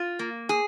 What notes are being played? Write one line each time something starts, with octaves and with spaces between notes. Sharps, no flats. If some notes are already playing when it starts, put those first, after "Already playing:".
Already playing: F4
A#3
G#4